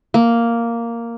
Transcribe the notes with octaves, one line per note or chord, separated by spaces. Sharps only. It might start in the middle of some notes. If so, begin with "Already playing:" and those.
A#3